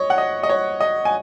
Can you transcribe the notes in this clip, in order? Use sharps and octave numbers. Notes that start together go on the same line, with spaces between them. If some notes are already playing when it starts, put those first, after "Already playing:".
Already playing: C#5 D#5
F#5
D#5
D#5
C#5
D#5
G#5